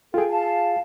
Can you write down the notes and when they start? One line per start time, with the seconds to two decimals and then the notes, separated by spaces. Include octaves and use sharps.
0.14 F4 G#4 A4 G5
0.29 F5 A5